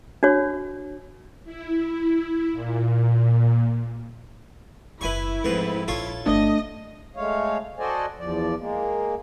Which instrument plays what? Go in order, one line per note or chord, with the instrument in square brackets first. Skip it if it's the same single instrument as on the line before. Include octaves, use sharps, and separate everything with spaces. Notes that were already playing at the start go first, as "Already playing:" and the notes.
[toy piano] D4 F#4 C#5
[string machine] E4
A#2
[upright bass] F#1 D#3 [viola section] E4 [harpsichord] B4 G#5 C#6
[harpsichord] F2 G#2 B4 [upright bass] A3
[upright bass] A#1 F2 [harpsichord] F4 A4 C#5
[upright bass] G1 E3 [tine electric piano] A3 D4 [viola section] D#5
[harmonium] G#3 A3 C#5 F5
F#4 A4 C5 D5 D#5 G#5
E2 F3 D5
G#3 A#3